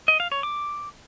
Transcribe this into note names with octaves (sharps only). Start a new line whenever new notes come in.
D#5
F5
C#5
D6